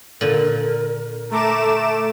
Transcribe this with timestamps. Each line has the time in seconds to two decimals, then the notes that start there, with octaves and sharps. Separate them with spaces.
0.21 A#2 D3 A#4
1.31 A3 A#5 D6 E7